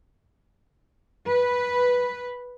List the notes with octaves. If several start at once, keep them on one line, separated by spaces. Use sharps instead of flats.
B4